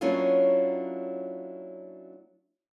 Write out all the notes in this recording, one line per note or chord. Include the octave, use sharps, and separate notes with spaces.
F#3 A#3 C#4 D4 E4 F4